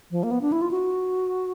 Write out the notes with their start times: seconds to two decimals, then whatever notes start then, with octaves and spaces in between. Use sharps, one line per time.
0.11 F3
0.23 A#3
0.31 B3
0.41 D4
0.52 E4
0.62 F4
0.71 F#4